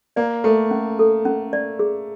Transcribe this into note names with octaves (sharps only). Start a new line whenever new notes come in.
A#3 D5
A3 A4
C#4
A4
C#4
D5
G#4